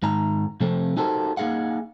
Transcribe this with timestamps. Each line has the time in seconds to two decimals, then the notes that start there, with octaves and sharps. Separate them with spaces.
0.03 G#2 D#3 A#5
0.60 C3 F3 A3 C4
0.97 D#4 F#4 G4 A4 A#4 C5
1.37 A#3 D#4 G#4 F5 F#5